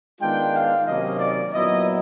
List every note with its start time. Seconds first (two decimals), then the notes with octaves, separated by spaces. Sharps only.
0.21 D#3 G#3 B3 D4 F4 G5
0.54 F5
0.86 C3 D#3 F#3 A#3 C#4 D#5
1.20 D5
1.54 A#2 F#3 B3 E4 D#5